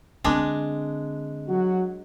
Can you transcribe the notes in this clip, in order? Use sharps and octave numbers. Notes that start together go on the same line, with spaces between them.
D3 G#3 C4 D4
F#3 F#4